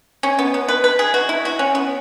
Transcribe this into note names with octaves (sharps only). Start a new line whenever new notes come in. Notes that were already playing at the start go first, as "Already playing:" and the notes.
C#4
B3
B3
B4
B4
G#4
F#4
E4
F#4
C#4
B3